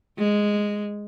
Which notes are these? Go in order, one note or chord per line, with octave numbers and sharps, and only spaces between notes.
G#3